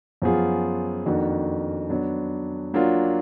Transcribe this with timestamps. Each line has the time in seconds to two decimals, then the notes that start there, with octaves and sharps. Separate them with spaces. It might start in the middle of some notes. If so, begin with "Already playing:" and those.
0.22 F#2 F3 B3 F4 G#4
1.06 F2 D#3 A#3 D4 F#4
1.90 F#3 B3 D4
2.74 F#3 A#3 D4 F4